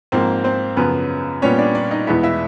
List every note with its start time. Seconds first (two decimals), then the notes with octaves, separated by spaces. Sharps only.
0.12 G#2 F3 A#3 C4 C5
0.44 C4 C5
0.77 F#2 C#3 F3 B3 B4
1.42 A#2 G3 B3 C#4 C#5
1.59 D4 D5
1.75 D4 D5
1.91 D#4 D#5
2.07 E2 B2 G#3 B3 E4 E5
2.23 E4 E5